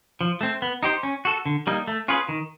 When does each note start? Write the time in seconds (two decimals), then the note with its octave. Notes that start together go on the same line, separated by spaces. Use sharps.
0.21 F3
0.41 A3 C4
0.62 B3
0.83 D#4 G4 C5
1.03 C#4
1.25 F#4 A4
1.46 D3
1.67 G3 A#3 D#4
1.88 A3
2.08 C#4 F4 G#4 B4
2.29 D#3